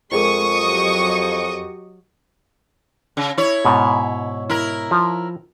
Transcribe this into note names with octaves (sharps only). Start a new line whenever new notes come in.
F2 G#3 F4 G#4 A#4 C#6 D#6
F#3 G4 D#5
C#3
E4 C#5
G#2 B2
E4 A#4
F3